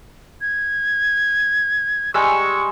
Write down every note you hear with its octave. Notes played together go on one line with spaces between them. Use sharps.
G#6
G3 G#3 C#6 E6